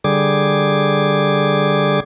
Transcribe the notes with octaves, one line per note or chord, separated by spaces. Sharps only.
D3 G3 G#4 D6